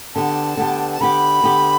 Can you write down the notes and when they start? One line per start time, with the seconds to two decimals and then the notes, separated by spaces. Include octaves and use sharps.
0.15 D3 B3 G4 A5
0.57 D3 B3 G4
0.92 A5
1.01 D3 B3 G4 B5
1.43 D3 B3 G4